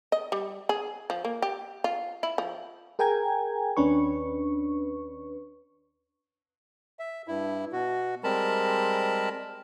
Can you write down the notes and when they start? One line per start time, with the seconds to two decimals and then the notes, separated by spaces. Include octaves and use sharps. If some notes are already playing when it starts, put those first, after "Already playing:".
0.12 D#5
0.32 G3
0.69 G#4
1.10 F3
1.25 A#3
1.42 G4
1.84 F4
2.23 E4
2.38 F3
2.99 G#4 A#4 G5 G#5 A#5 G#6
3.77 D#2 C#4 D4 B4 C#6
6.99 E5
7.27 G2 E4
7.72 B2 F#4
8.24 G3 G#3 C4 A#4 A5 B5